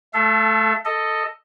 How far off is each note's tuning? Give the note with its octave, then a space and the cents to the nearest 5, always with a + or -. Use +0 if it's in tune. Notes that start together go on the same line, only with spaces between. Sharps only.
A3 -20 A4 +0 E5 +45
A4 +10 D#5 +0